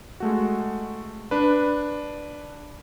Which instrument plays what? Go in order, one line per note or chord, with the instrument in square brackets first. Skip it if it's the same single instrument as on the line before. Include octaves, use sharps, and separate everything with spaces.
[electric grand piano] G#3 A3 F#4
D4 B4